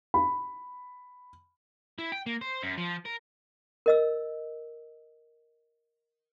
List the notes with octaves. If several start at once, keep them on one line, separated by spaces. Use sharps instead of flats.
B5
E4
G5
A#3
C5
F#2
F3
A#4
A#4 D#5 E6